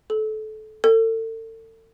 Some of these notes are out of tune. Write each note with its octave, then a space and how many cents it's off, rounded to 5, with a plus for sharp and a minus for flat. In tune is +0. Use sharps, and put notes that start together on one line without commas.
A4 -25
A4 +35